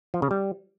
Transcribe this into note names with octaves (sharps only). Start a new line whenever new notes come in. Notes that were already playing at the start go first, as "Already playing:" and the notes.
F3
C#3
G3